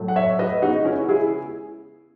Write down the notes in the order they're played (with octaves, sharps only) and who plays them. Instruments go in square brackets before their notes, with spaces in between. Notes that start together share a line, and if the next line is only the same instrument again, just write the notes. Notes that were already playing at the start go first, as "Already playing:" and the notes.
Already playing: [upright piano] A2 F#3 A3
F#5
C#5 E5
B4 D#5
C#3 G#3 B3 D#4 F#4
C#4 E4
E4 G#4